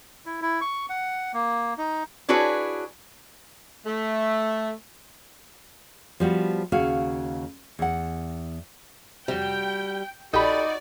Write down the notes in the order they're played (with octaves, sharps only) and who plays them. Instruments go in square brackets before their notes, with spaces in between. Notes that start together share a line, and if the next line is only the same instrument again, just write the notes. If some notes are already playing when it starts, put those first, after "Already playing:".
[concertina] E4
E4
C#6
F#5
A#3
D#4
[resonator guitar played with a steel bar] D4 E4 F#4 G#4 B4 C#5
[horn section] A3
[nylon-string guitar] F3 G3 B3 F#4
D#2 C#3 F#4 F5
E2 F#5
[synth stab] F2 C3 [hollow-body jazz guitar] G3 F#4 [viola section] G5
[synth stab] A#1 G4 B5 [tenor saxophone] D#4 [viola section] F#4 D5 [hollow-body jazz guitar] A4 G5